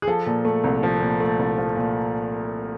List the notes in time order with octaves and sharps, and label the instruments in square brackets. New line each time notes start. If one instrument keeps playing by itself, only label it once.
[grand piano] G#4
F3 A4
A#2
A3
C2
F3
A#2
A3
C2
F3
A#2